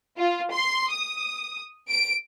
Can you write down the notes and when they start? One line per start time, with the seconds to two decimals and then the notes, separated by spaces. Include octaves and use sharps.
0.17 F4
0.52 C6
0.91 D#6
1.88 D7